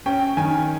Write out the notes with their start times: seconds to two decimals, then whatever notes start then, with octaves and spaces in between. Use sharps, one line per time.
0.06 C#4 G5
0.37 D#3 G#5